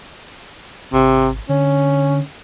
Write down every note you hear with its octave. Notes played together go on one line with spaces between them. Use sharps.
G#1 C3
D3 C#4